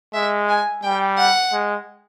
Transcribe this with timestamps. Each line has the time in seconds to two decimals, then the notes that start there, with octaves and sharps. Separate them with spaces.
0.14 G#3 E5
0.49 G#5
0.83 G3 G5
1.18 F#5
1.53 G#3